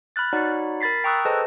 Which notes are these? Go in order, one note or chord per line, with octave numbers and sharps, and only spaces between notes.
B5 F6 F#6 A6
D#4 F#4 C#5 D5 F#5 B5
A#4 B5 A6 B6 C7
G5 A#5 C#6 D#6 E6 F#6
G#4 A4 B4 C5 D#5 A5